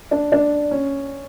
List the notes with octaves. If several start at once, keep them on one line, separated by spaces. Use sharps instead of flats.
D4
D4
C#4